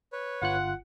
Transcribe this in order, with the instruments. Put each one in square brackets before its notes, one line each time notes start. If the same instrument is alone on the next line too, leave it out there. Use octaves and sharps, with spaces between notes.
[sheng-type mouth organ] B4 C#5
[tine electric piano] G1 F4 F#6 [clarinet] F#5